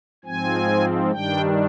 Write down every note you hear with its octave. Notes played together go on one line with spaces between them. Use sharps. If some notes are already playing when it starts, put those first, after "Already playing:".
G#2 F3 C4 G#5
G2 D#3 G3 D4 G5